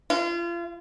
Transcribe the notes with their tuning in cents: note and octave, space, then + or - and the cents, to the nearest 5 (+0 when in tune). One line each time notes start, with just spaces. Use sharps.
F4 -35